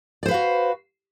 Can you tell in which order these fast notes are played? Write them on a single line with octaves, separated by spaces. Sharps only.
D5 C5 B4 F5 F#4